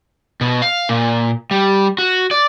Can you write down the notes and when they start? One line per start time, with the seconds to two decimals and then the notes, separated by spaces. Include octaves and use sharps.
0.41 B2
0.62 F5
0.89 A#2
1.51 G3
1.98 F#4
2.31 D5